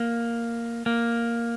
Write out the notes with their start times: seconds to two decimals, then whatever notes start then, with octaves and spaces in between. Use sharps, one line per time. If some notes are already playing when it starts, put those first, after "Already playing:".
Already playing: A#3
0.86 A#3